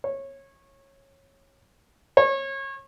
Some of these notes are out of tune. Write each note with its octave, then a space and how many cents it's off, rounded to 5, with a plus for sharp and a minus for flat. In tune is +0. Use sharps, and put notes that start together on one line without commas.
C#5 -20
C#5 -30